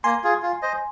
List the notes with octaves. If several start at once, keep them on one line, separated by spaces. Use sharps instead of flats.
A#3 G#5 C6
F4 G#4
F4
C5 D#5